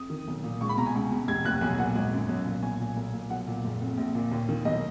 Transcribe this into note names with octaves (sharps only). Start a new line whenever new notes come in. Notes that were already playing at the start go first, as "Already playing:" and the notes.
Already playing: F2 D#6
D#3
B1
A#2
C#2 C#6
B5
B2 A#5
G#5
C#2
B2
F1 G#6
D#2 F#6
B1 G#5
A#2 F#5
G#1
F#2
B1
A#2
B1 G#5
A#2
B1
A#2
B1 F#5
A#2
F#1
F2
A#1
A#2
D#2
D#3
B1 D#5